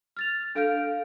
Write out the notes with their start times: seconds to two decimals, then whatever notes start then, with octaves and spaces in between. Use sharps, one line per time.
0.17 F6 A6 F7
0.55 D4 A4 F5 F6 G6 D7